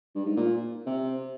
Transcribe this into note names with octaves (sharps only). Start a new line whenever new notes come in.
G2
G#2
A#2
C3